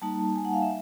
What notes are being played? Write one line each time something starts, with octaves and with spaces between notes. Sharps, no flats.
G3 A#3 D#4 A5
G#5
F#5
F5
E5